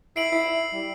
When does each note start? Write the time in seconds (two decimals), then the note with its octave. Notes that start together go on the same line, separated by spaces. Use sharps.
0.16 E4 C7 D7 F#7
0.32 E4
0.73 G3